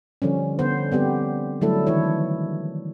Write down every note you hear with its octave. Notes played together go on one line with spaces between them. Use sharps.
D3 F3 G3 C#4
D3 B3 C5
G3 B3 C4 G4
D3 F#3 G3 A3 E4 A4
D#3 E3 E4 C#5